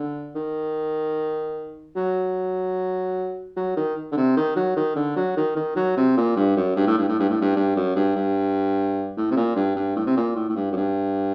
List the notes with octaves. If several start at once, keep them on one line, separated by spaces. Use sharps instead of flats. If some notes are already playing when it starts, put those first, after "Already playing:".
Already playing: D3
D#3
F#3
F#3
D#3
D3
C3
D#3
F#3
D#3
D3
F#3
D#3
D#3
F#3
C3
A#2
G2
F#2
G2
A2
G2
A2
G2
A2
G2
G2
F#2
G2
G2
A2
C3
A#2
G2
G2
A2
C3
A#2
A2
A2
G2
F#2
G2